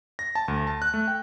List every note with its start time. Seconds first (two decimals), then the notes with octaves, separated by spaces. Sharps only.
0.19 A#6
0.35 A5
0.48 D2
0.67 A5
0.82 F#6
0.94 A3
1.08 G5